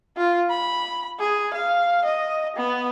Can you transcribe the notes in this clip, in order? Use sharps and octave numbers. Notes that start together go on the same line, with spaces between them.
F4
B5
G#4
F5
D#5
B3